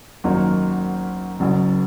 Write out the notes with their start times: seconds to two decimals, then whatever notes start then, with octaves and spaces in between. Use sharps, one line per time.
0.24 G#1 F#2 F#3 A#3 D#4
1.40 F#1 F#2 F#3